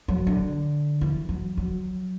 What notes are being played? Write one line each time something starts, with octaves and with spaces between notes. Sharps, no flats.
F#3
D3
E3
F#3
F#3